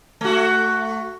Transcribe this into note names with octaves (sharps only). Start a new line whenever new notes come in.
A3 F#4